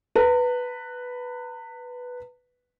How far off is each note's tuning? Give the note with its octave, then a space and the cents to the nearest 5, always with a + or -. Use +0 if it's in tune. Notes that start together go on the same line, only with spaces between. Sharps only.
B4 +0 A#5 -45